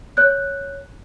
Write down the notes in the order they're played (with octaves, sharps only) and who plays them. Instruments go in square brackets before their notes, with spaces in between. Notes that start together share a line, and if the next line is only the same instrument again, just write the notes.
[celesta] C#5 F#6 G6